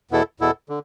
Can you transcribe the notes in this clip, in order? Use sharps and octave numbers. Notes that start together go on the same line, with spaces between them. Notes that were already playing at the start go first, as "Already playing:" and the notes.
E2 B2 B3 E4 A4
E2 B2 B3 E4 A4
D3